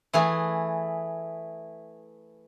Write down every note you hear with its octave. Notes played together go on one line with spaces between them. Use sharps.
E3 A3 G#4